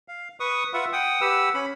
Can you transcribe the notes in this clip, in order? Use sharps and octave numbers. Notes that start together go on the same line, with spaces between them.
F5
B4 C#6 D#6
F4 B4 E5 F#5
F#5 G5 D#6
G4 B4 F#5 E6
C#4 B5